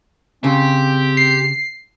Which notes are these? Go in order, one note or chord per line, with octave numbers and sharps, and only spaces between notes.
C#3 C4 G4
C7